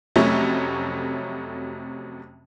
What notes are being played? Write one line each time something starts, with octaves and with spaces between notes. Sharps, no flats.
F2 C3 F#3 A3 C#4